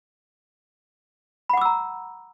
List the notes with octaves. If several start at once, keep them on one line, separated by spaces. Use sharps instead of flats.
F#5 A#5 B5 D6 E6